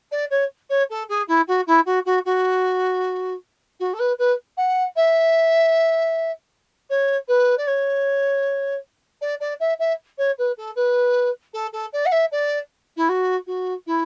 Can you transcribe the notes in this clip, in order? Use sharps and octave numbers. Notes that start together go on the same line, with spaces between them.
D5
C#5
C#5
A4
G#4
E4
F#4
E4
F#4
F#4
F#4
F#4
A4
B4
B4
F#5
E5
C#5
B4
D5
C#5
D5
D5
E5
E5
C#5
B4
A4
B4
A4
A4
D5
F#5
E5
D5
E4
F#4
F#4
E4